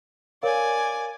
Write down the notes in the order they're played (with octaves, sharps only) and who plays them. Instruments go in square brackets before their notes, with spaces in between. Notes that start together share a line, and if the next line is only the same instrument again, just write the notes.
[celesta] A#4 C#5 F5 [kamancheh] D5 G#5